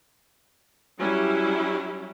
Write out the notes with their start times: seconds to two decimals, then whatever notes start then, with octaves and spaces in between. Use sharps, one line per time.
0.97 F#3 G3 C#4 E4